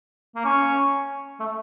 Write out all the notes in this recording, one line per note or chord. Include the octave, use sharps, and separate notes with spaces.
A#3
C#4
A3